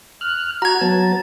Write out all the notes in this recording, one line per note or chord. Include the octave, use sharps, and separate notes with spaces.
F6 F#6
F#4 A#5 G#6
F#3 B3 A5